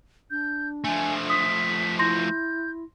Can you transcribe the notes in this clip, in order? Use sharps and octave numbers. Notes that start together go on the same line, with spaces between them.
D4 G6
F3 A3 G#5
D#6 B6
E4 C6 G6 A#6